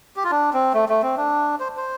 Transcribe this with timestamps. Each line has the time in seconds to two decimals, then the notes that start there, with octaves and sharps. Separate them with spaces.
0.16 G4
0.24 F4
0.31 D4
0.53 C4
0.74 A3
0.89 A3
1.02 C4
1.17 D4
1.60 C5
1.77 C5